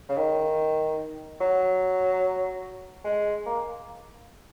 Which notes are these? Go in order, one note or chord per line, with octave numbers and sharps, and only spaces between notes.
C#3
D#3
F#3
G#3
A#3